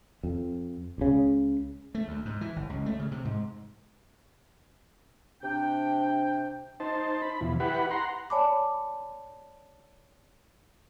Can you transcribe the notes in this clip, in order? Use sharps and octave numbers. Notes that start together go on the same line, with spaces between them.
F2
C#2 C#3
A3
D2
G#2
E3
G1
C#2
A3
C#3
C3
G#2
C3 D4 G5
D#4 C5 A5
B5
E2 B2 E3 F3
E4 G4 B4 F#5 B5
F#5 A#5 C6
C#5 D5 G#5 A5 B5 D6